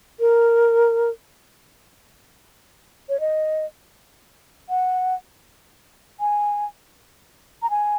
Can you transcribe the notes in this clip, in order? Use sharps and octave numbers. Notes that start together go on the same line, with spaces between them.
A#4
C#5
D#5
F#5
G#5
A#5
G#5